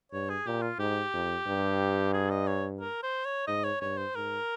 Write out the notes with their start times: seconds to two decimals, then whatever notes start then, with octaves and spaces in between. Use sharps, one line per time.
0.12 G2 C#5
0.29 G#4
0.46 A#2 G4
0.62 F4
0.79 G#2 G4
1.13 F2
1.46 G2
2.13 G#4
2.30 D#5
2.47 C#5
2.80 A#4
3.03 C5
3.25 C#5
3.47 G#2 D#5
3.64 C#5
3.81 G2 C#5
3.97 C5
4.15 G#2 A#4